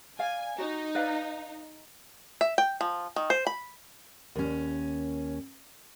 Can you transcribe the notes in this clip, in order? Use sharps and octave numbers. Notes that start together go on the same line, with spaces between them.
D5 F5 G#5
D#4 F#4
B4 D5 F5
E5
G5
F3
D#3
C5
B5
D#2 C#4